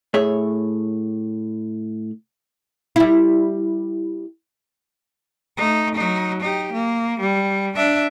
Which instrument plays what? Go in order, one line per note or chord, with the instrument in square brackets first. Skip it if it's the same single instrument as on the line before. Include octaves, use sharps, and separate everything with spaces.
[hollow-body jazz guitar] A2 G#4 C#5 E5
[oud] G3 E4
[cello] A3 D#4
F#3 D#4
D#4 G4
A#3
G3
D4 E5